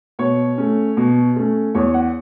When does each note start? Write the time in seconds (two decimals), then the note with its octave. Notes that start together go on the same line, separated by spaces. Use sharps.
0.19 B2 C#5
0.58 A3 C#4
0.97 B2
1.36 A3 C#4
1.75 E2 C#5
1.94 F#5